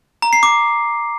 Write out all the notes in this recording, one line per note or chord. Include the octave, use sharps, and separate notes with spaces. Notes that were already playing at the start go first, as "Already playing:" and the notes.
A#5
C7
D6